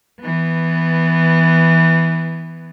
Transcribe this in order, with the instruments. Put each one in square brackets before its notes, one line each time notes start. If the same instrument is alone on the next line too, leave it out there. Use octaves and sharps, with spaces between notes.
[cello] E3 B3